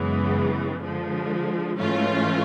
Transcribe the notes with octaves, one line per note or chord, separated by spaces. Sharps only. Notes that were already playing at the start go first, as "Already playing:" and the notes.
Already playing: F#2 C#3 E3 G#3 B3
D3 F3 G#3
G#2 E3 A3 C#4 F4